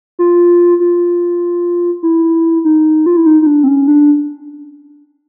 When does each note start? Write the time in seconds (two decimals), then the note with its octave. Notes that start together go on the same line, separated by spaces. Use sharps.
0.19 F4
0.80 F4
2.03 E4
2.65 D#4
3.06 F4
3.17 E4
3.26 D#4
3.42 D#4
3.47 D4
3.64 C4
3.68 C#4
3.88 D4